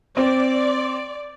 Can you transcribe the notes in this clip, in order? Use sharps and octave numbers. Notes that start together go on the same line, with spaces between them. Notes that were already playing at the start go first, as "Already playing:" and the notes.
C4 D5